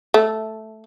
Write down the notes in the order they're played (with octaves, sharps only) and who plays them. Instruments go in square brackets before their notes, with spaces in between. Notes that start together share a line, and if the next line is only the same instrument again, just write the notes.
[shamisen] A3